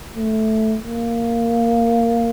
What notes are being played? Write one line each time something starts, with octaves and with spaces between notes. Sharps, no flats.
A3
A#3